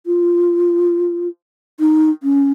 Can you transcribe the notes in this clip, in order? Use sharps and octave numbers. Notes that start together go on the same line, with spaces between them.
F4
D#4
C#4